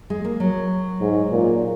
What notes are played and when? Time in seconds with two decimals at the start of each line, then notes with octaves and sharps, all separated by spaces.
0.10 G#3
0.25 A#3
0.40 F#3
1.01 G#2
1.32 A#2